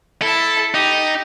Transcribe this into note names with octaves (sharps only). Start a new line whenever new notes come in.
E4 A4 A5
D#4 G4